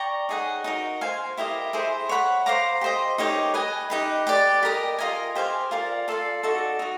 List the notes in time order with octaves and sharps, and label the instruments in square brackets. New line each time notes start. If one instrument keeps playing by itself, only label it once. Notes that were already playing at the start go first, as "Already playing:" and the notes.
Already playing: [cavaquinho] D5 G5 A#5 C#6
D#4 G#4 C#5 F#5
D#4 F#4 A#4
C5 F5 G#5
E4 G4 A#4 D#5
E4 G#4 C5
C#5 F#5 B5
C5 F5 A#5 D6
G4 C5 D#5
D#4 G4 A#4 C#5
B4 D#5 G#5
D#4 G4 B4
G4 B4 D5
G4 A#4 D#5
F4 A#4 D#5 G#5
G4 C5 F5 G#5
F4 A#4 D5
F4 A4 D5 F5
D#4 F#4 A4 D5
D#4 F#4